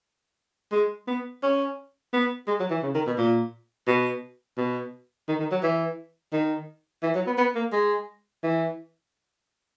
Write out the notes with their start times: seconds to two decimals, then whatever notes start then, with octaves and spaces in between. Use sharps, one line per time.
0.72 G#3
1.08 B3
1.43 C#4
2.13 B3
2.47 G#3
2.60 F#3
2.70 E3
2.83 C#3
2.95 D#3
3.07 B2
3.18 A#2
3.88 B2
4.58 B2
5.28 D#3
5.40 D#3
5.51 F#3
5.63 E3
6.33 D#3
7.03 E3
7.15 F#3
7.27 B3
7.38 B3
7.55 A#3
7.73 G#3
8.43 E3